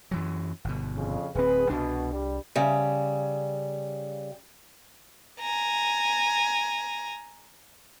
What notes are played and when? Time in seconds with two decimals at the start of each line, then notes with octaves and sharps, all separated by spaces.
0.11 F#2 E3 F#3
0.65 G1 B2
0.95 F2 C#3
1.35 D1 C4 G#4 B4
1.70 C2 B2 D4
2.11 G3
2.55 C#3 G3
5.40 G#5 A#5